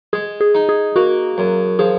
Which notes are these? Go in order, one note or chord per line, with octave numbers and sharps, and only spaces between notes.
G#3 G#4
G#4
D#4
G#4
A#3 F#4
F#2
F3 G#4